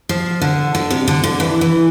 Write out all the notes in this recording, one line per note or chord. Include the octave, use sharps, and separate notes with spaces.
F3
D3
D3
C3
D3
D3
E3
E3